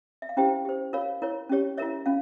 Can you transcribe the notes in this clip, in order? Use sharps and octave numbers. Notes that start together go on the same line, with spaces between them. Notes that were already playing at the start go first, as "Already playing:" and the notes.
E5
F5
C#4 E4 G4 C5 G5
G4 C5
F4 A#4 C#5 F5
E4 A#4 C#5
C#4 G4 C#5
E4 A#4 C#5 E5
C#4 F4 F5